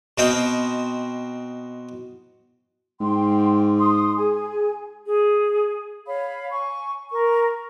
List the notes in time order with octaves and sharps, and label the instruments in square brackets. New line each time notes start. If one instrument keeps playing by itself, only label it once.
[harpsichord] B2 C4 D#5 F5 G5
[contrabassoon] G#2 [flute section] G5 C6
[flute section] C6 D#6
G#4 G#5
G#4
C#5 F5 B5
G#5 C#6
A#4 C#6